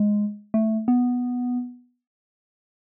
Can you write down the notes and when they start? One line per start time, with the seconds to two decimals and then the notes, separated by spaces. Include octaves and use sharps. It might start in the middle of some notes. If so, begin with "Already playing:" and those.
Already playing: G#3
0.54 A3
0.88 B3